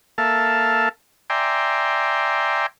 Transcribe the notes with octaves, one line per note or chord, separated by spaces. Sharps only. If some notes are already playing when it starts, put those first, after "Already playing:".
A#3 A4 E5 F5 A5
D5 E5 G5 G#5 A#5 C6